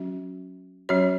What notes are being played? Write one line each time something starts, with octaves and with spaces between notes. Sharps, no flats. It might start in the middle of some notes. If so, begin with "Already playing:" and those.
Already playing: F#3 C#4 F#4
F#3 C#4 F#4 C#5